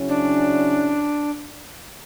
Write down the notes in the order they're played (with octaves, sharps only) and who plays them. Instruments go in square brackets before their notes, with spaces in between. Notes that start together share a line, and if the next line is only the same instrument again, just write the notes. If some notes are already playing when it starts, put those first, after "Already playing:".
Already playing: [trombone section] C#3 F#3 C#4 E4
[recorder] D4